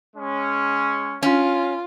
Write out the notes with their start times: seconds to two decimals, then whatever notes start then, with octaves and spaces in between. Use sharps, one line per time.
0.16 G#3 C#4
1.23 C#4 F4